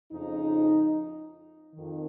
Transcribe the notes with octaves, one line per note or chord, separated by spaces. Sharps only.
F2 C#3 F3 D#4
F2 D#3